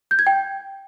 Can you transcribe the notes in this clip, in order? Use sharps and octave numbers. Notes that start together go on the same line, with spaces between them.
G6
G#6
G5